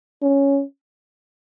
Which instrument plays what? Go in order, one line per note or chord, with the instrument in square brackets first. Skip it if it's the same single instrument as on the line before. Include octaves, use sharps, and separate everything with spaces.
[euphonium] C#4